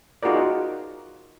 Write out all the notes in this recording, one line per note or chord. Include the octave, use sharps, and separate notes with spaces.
D#4 F4 F#4 G#4 A#4 D5